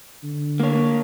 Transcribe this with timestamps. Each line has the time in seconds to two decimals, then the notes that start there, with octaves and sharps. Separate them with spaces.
0.23 D3
0.60 A#3 C#5